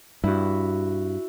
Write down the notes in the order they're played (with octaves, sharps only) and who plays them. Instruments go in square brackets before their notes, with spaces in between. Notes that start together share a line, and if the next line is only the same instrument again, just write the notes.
[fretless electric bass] G2 [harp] E4 F#4